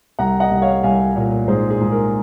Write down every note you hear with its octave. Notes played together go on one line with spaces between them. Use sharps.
C2 F#5 A#5
D#5 F#5
C2
C#5 F5
C2 F5 G#5
A#2
G#2 G#4 C5
G#4
G#2
A#4